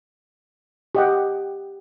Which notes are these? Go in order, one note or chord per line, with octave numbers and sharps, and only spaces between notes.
G4 D#5 F#5